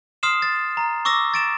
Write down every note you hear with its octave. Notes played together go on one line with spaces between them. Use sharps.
C6 D#6 F6 C7 E7
A6
A#5
C#6 D6 E6 A#6
A6 D7 E7